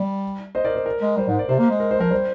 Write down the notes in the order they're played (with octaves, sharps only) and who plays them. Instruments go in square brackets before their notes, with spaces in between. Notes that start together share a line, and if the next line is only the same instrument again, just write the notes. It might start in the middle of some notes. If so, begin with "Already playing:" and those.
Already playing: [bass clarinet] G3
[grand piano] C5 D#5
A#4 D5
C5
A#4
[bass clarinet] G#3
[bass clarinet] G3 [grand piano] C5
[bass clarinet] G#2
[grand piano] D5
[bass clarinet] C3 [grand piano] C5
[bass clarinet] A#3
G#3
[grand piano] A#4
C5
[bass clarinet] F3 [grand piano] A#4
[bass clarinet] G3 [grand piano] C5